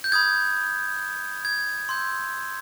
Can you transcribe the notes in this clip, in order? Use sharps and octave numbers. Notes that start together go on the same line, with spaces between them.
G6
B5 D#6 F#6 G#6
G#6
C6 E6 G6